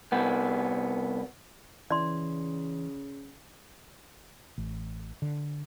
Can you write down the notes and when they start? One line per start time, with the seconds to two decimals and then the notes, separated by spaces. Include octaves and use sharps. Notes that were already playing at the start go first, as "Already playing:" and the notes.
0.12 C2 B3
1.91 C#3 E3 D5 C6
4.58 A1
5.22 D3